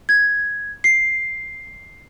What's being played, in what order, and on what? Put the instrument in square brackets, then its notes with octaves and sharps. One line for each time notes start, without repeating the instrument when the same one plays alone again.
[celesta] G#6
C7